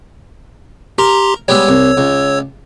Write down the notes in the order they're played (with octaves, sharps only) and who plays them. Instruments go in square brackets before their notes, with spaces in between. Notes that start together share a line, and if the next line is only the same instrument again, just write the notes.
[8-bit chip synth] G4 A#5 C6 [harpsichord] A#4
[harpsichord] G3 G#3 B3 [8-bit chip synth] C#5 E6
[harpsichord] C2
C#2